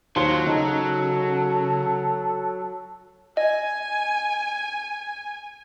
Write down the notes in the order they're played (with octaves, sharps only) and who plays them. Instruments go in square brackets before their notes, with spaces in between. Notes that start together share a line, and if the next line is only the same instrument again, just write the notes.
[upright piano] D#2 C6 G7 [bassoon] F3 [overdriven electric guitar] F#3
[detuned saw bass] C#3 [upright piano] D#4 [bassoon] A4
[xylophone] D#5 [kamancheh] G#5